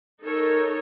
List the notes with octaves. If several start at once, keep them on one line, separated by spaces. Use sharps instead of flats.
D#4 A4 A#4 C#5